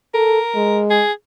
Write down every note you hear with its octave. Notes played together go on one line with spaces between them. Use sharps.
A4 A#4
G#3
G#4